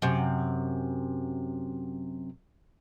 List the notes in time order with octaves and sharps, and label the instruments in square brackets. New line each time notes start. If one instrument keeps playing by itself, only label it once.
[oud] F#2 C3